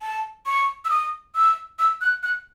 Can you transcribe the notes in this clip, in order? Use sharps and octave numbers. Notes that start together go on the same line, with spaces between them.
A5
C#6
E6
D#6
E6
E6
F#6
F#6